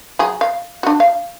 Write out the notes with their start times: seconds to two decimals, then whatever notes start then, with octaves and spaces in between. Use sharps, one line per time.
0.19 F#3 G#4
0.41 F5
0.83 D4 F#4
1.00 F5